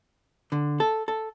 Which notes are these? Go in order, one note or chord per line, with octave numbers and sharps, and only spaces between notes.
D3
A4
A4